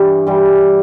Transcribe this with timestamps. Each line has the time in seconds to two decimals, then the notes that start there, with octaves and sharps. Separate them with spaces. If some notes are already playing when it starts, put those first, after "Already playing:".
Already playing: G2 E3 G3
0.26 G2 E3 G3